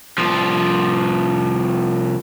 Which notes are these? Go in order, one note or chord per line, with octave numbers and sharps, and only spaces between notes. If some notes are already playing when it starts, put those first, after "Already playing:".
C2 F3